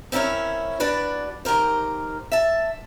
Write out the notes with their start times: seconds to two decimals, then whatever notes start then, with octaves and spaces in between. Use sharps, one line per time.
0.12 C4 C#4 E4 A#4 C#5
0.80 D4 F#4 B4 D5
1.45 D#3 G4 A#4 C5
2.32 E5 A5